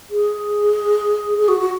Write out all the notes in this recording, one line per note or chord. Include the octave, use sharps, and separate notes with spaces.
G#4
G#4
F#4
F#4